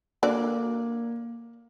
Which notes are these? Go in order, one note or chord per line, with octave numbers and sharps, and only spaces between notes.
D3 A#3 F#4 D5